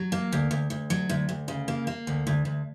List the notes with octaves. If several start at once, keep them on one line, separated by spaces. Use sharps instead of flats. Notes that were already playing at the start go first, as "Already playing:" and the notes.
Already playing: F#3
A#3
D2
D2
D2
F#3
D2
D2
C#3
A#3
A#3
D2
D2
D2